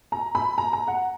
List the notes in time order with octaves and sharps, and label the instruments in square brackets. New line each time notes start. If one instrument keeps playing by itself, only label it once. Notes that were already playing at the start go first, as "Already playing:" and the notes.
[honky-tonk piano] A#5
B5
A#5
A#5
F#5